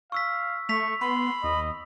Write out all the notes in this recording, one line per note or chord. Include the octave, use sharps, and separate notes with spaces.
F5 C#6 E6 B6
A3 C#6 B6 F7
B3 B5 C6
D#2 D#5